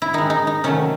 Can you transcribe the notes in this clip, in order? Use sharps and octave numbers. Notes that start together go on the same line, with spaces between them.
E4
D#3 G#3 D#4
D#4
D#4
C3 D#3 F#3 A3 C#4